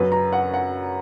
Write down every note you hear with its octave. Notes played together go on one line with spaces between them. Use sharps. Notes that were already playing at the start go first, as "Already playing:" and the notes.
Already playing: F#2 C#3 F#3 B4
A#5
F#5
F#5